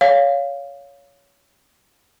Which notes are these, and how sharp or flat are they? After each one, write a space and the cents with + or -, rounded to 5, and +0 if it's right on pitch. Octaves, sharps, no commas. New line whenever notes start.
C#5 +20 F5 +0